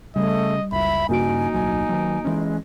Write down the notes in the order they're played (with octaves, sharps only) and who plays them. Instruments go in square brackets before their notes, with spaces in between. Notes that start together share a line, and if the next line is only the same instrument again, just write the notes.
[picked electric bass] C#3 [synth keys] G3 [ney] A3 [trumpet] D#5
[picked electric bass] F#1 C#2 [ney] E5 [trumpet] B5
[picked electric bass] G2 C#3 [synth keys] A#3 F#4 D7 [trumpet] D#4 [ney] G#5
[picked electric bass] D1 B1 F#3 [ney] G#5
[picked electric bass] D#3 F#3
[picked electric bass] E3 C#4 [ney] G#3